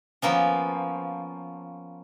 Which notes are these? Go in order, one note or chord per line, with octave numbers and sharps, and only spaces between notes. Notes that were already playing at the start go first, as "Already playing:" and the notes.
F3 A#3 B3 C#4